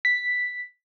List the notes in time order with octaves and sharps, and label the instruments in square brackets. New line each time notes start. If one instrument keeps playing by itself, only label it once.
[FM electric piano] B6